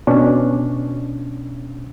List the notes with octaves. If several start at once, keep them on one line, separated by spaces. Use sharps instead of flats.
B2 C#4 D4